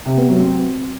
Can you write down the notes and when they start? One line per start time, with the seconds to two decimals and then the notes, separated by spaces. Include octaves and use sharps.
0.06 C3
0.17 B3
0.29 F#3
0.40 C4